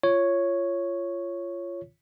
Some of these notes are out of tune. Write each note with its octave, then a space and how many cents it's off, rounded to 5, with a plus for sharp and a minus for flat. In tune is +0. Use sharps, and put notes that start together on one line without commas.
F4 -15 C#5 +0